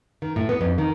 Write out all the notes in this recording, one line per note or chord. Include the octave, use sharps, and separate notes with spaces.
D#3
A2
B3
F2
D#3